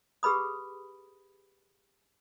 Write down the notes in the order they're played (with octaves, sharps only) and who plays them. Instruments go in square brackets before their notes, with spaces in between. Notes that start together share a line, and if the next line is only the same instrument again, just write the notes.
[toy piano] G4 G#4 B4 B5 D#6